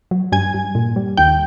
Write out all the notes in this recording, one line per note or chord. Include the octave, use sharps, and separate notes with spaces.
F#3
G2 G#5 G#6
G2
A#2
G3
D#2 G5 G6